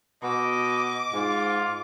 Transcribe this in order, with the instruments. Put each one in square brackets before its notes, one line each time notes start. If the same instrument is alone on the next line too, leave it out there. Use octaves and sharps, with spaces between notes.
[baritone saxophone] B2 [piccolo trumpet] D#5 [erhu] D6
[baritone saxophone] G#2 [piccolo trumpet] F4